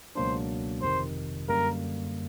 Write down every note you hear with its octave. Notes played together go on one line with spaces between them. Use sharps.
C#2 B2 F#3 A#3 D4 C5
G1 F2 C3 D#3 C5
F#2 D3 G3 A#3 A#4